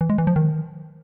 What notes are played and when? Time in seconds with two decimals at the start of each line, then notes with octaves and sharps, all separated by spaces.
0.01 E3
0.10 G#3
0.18 E3
0.27 F3
0.36 D#3